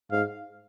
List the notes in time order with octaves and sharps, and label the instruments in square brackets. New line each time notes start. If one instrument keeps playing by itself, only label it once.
[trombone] G#2 [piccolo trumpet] F5